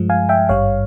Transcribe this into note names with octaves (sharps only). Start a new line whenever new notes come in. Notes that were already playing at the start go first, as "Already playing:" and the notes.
Already playing: G2 F3 G#3
F5 G#5
E5 G5
G#1 G2 G3 C#5 F5